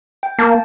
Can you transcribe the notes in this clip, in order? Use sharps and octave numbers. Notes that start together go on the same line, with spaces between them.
G5
A#3 A5